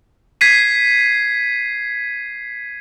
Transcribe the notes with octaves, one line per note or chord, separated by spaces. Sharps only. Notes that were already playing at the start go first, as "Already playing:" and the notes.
G#6 B6 C7 D#7